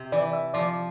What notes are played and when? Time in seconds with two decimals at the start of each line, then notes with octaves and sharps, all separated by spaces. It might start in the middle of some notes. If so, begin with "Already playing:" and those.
Already playing: C3
0.12 E3 D5
0.33 E5
0.54 F3 D5